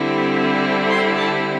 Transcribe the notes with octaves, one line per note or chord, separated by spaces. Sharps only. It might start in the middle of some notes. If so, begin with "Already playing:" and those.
Already playing: D3 G3 C4 E4
C6
A5